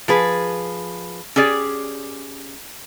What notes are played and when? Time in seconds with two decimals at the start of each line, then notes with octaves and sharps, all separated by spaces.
0.08 F3 G#4 B4
1.36 C#4 G4 G#4 D5